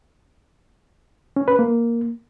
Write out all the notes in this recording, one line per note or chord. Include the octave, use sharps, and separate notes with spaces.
C#4
B4
A#3